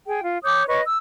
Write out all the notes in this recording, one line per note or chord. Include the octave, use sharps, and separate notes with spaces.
G#4 G5
F4
C#5 D6 D#6 G6
B4 C#5 D#5 C#6
E6